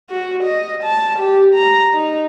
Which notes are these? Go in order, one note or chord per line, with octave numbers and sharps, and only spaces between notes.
F#4
D#5
A5
G4
A#5
D#4